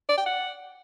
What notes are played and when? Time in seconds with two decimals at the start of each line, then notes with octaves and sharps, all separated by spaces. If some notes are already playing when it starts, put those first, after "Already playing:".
0.09 D5
0.17 G5
0.26 F#5